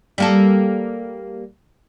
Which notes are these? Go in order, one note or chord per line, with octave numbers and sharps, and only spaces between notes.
G3 A#3 A4